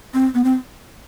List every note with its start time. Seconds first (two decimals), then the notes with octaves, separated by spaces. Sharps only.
0.14 C4
0.35 B3
0.44 C4